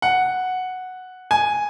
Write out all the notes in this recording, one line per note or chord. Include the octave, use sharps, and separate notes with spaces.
F#5
G#5